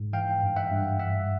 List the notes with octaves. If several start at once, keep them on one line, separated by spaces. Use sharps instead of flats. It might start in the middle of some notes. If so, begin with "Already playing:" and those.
Already playing: G#2
E3 F5 G5
G2
E5 F#5
G2
G3 E5 F#5